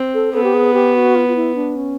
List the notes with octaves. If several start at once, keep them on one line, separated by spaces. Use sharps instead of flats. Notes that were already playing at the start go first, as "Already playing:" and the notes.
Already playing: C4
A4
B3 A4
G4
G#4
G4
F#4
F4
F4
E4
D4
C#4